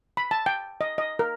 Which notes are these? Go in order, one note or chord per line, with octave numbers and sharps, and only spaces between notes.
B5
A5
G5
D#5
D#5
A#4